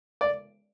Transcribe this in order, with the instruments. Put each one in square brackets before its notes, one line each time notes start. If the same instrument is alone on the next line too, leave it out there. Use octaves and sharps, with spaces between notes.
[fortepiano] D5